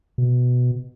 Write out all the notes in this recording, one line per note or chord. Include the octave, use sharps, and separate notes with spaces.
B2